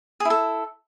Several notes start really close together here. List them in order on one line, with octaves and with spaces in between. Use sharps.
G#4 E4 A4